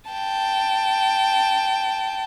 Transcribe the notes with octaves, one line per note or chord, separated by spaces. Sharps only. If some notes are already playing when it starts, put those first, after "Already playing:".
G5 A5